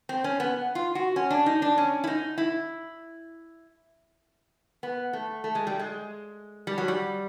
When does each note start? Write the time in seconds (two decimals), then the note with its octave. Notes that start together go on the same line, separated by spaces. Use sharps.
0.09 C4
0.24 C#4
0.40 B3
0.75 F4
0.95 F#4
1.16 C#4
1.30 D4
1.46 D#4
1.62 D4
1.78 C#4
2.04 E4
2.07 D#4
2.38 E4
4.83 B3
5.13 A3
5.44 A3
5.55 G#3
5.67 G3
5.79 G#3
6.67 G3
6.78 F#3
6.88 G3